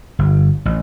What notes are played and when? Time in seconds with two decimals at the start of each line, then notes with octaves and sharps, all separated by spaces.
0.19 G1
0.65 A1